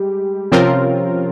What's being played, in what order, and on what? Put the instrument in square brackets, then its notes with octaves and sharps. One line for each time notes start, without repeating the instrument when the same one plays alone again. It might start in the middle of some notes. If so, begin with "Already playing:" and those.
Already playing: [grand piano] G3 [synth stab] G#3 G4
[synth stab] C3 F3 C4 F4 A#4 [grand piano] C#4